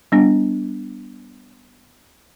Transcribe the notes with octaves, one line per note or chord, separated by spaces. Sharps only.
G3 B3 D4